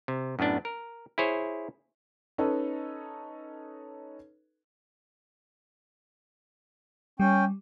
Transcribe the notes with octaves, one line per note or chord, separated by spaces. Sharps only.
C3
F#2 A2 B3 D4
A#4
E4 G#4 C5 C#5
C#4 D#4 A4 B4
G3 C#4 G5